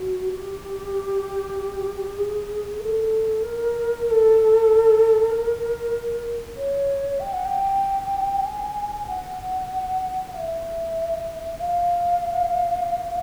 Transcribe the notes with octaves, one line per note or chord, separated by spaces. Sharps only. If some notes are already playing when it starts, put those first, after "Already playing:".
Already playing: F#4
G4
G#4
A#4
A4
A#4
A#4
A4
A#4
C#5
G5
F#5
G5
G#5
F#5
F5
E5
F5